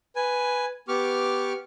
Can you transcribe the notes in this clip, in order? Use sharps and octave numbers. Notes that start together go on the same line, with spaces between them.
B4 G#5
B3 G4 C#6 D6 F6